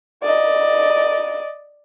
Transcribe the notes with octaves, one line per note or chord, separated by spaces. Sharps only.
D5 D#5